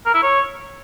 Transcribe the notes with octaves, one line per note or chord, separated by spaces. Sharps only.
A#4
E4
C#5